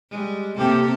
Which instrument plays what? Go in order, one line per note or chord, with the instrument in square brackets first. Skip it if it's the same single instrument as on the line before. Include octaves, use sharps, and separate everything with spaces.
[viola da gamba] G3 G#3
[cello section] C3 [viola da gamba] A#3 A4 A#4 [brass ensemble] G4